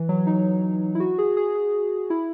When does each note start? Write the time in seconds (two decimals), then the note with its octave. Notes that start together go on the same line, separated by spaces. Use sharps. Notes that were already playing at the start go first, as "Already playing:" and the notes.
Already playing: E3
0.09 F#3
0.27 D#4
0.95 E4
1.00 F#4
1.18 G#4
1.37 G#4
1.55 G#4
2.10 E4